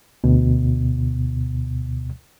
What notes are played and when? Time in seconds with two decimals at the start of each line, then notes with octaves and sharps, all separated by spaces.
0.24 D2 B2